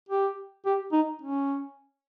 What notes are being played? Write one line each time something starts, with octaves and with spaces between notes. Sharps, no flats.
G4
G4
D#4
C#4